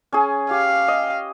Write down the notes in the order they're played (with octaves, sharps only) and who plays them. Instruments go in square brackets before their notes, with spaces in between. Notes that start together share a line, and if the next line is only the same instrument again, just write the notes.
[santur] C#4 G#4
[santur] G4 [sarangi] F5
[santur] D#5